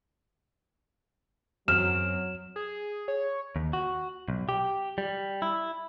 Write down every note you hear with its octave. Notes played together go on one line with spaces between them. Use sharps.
F#2 F#3 C4 F6 E7
G#4
C#5
D#2
F#4
B1
G4
G3
E4